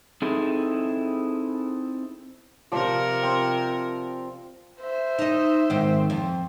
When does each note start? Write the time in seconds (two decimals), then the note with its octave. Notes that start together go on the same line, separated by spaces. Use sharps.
0.22 C4 D#4 E4 G#4 A4
2.72 C3 F3 A#4 D5
3.23 C4
4.81 C5 E5
5.19 D#4 D#5
5.70 G#2 D#3 C4
6.10 F2